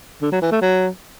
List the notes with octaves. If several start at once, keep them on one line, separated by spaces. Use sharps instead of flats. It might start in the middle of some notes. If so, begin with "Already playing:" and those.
D3
F#3
E3
A3
F#3